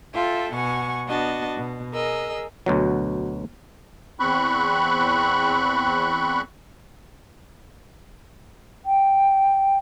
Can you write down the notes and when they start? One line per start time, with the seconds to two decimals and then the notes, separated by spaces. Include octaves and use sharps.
0.13 F4 A4 E5 G5
0.53 B2 F#5 G#5 C#6
1.07 B3 D4 F#4 D#5 A5
1.58 B2
1.94 G#4 A#4 D#5 E6
2.66 D2 B2 F#3
4.20 E2 C4 B5 C#6 F#6
8.86 G5